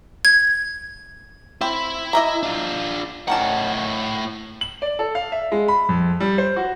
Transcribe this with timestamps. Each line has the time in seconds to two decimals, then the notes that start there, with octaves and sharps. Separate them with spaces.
0.25 G#6
1.61 C4 E4
2.13 D#5 E5 A#5
2.43 D4 F4
3.28 A2 D#3 C#4 F#5 A5
4.61 F#7
4.82 D5
4.99 A4
5.15 F5
5.32 E5
5.52 G#3
5.68 B5
5.89 F2
6.20 G3
6.38 C5
6.57 F#4